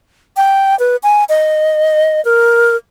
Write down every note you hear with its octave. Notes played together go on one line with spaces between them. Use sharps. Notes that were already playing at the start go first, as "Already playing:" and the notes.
G5
B4
G#5
D#5
A#4